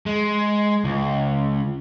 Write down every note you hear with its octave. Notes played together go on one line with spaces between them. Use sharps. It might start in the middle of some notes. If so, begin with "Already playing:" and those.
G#3
C#2